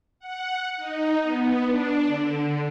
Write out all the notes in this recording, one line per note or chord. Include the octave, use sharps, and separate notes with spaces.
F#5
D#4
B3
D4
D3